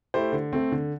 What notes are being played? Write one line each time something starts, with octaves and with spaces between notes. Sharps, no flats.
A3 E4 G4 C5
D3
A3 C4
D3